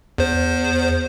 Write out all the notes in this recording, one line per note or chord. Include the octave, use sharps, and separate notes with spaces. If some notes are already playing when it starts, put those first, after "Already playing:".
E2 C5